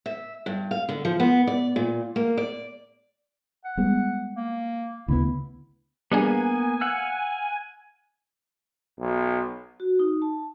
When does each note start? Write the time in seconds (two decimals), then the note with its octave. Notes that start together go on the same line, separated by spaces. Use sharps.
0.06 E5
0.46 G2
0.71 F5
0.89 D3
1.05 F3
1.20 B3
1.47 D5
1.76 A#2
2.16 A#3
2.37 D5
3.65 F#5
3.77 G3 G#3 B3
4.36 A#3
5.08 D2 C#3 B3 E4
6.12 G3 A#3 B3 D4 G#4 G#5
6.81 F5 F#5 E6
9.00 B1
9.80 F#4
9.99 D#4
10.22 A5